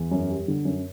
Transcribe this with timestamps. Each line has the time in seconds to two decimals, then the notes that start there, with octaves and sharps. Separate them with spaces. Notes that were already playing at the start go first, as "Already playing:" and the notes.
Already playing: E2
0.11 F#2
0.29 G3
0.48 D3
0.65 F#2